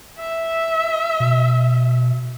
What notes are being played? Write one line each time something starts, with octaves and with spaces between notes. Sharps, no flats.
E5
B2